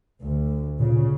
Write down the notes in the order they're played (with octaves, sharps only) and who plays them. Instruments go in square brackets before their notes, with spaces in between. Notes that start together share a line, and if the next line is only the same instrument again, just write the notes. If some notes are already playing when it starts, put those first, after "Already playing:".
[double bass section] D2
[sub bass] A#2 [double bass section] C#3